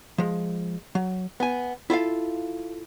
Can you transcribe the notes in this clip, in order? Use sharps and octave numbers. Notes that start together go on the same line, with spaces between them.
F3 G#3
F#3
B3 G#5
E4 F4 A4 F5